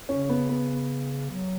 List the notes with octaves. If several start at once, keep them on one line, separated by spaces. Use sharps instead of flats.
C#3 C#4
B3
B3
F#3